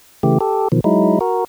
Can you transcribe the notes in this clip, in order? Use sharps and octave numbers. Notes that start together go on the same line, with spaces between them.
C#3 E3 A3 G4
G4 A4
B2 D#3 F3
F#3 G#3 D#4 E4
F#4 A#4